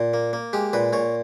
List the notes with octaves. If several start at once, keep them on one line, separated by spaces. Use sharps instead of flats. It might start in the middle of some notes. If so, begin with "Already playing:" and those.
Already playing: A#2
A#3
A#3
G#3 G4
A#2 B4
A#2 C#5